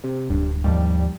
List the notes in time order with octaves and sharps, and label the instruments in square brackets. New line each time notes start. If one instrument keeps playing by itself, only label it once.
[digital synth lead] C3
[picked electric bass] D1 [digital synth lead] G2
[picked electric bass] D#2 G#2 F3 [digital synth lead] G3